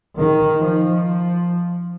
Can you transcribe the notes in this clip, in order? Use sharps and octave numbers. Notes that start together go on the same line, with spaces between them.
D#3
F3